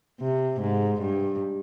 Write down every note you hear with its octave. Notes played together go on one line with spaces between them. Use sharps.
C3
G#2
G2